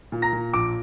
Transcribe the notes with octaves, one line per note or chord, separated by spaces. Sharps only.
A#2
A#5 A#6
A#2
A#1 D6 D7